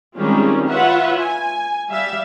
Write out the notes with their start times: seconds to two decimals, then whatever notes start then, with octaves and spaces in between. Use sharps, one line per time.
0.16 D#3 G3 G#3 C4 C#4 F4
0.67 F4 B4 C#5 E5 F#5
1.18 G#5
1.90 G3 E5 F5